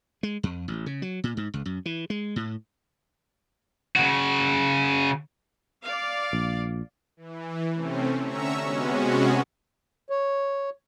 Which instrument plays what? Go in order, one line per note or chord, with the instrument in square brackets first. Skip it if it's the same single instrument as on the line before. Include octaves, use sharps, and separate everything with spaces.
[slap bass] G#3
F2
A1
C#3
F#3
A#2
G#2
C#2
F#2
E3
G#3
A2
[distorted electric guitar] C#3 F#4
[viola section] D5 F5
[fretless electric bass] A#1
[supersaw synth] E3
C3 A3 C4 C#4
D3 C#4 E5 A#5 C#6 E6
C3 G#3 B3 C#4 F#4
[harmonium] C#5